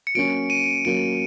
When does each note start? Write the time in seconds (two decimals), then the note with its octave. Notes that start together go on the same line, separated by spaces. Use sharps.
0.07 C#7
0.15 F#3 A#3 C#4 D7
0.50 D#7
0.85 F#3 A#3 C#4 D7